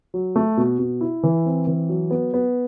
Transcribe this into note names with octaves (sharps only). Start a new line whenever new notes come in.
F#3
A3
B2
B2
E4
E3
C4
E3
F#3
B3
B3